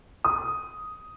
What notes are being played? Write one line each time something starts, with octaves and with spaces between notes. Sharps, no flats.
D#6